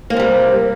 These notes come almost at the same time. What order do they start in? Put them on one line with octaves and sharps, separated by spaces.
A#3 C4 C3 G3